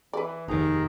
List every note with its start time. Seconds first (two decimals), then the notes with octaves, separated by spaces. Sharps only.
0.13 E3 B4 D5
0.48 F1 D#2 D#3 G#4 A#5